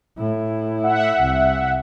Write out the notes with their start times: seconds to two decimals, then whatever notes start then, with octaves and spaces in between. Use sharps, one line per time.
0.18 A2 E4
0.84 E5 F#5
1.20 C2